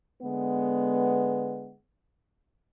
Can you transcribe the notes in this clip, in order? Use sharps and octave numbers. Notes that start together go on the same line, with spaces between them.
D3 G#3 B3